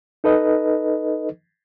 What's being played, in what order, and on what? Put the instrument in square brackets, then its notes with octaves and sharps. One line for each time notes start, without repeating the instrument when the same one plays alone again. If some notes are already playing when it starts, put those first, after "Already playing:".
[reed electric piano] D#4 A4 B4 D#5